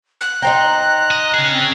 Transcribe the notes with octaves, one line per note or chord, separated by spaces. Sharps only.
F#6
D#4 C5 G5 A#5
D#5
C#4 G#4
C4